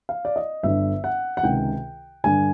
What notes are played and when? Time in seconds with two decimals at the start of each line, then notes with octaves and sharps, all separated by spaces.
0.09 F5
0.25 D5
0.36 D#5
0.63 G1 G2 D3 E5
1.04 F#5
1.37 F#5
1.43 C#2 C3 D#3 G5
2.24 G2 D3 G#5